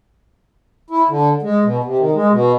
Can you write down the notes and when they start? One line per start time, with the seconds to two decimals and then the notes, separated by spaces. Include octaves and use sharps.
0.90 E4
1.09 D3
1.42 G#3
1.64 B2
1.84 C3
1.99 D#3
2.15 G#3
2.31 B2